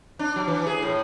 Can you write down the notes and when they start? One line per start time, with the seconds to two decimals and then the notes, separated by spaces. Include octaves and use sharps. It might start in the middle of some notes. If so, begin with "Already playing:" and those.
0.19 D4
0.36 F#3
0.48 E3
0.67 G#4
0.82 A2